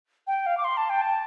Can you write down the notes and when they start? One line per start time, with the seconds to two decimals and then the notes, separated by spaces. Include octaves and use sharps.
0.27 G5
0.46 F5
0.57 D6
0.64 C6
0.77 A5
0.90 G5
1.02 A5